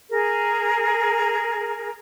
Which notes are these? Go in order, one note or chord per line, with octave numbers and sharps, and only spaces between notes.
G#4 A#4